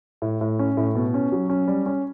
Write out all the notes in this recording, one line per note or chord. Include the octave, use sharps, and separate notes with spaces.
A2
A2
C#4
A2
B2
C#4
F#3
C#4
G3
C#4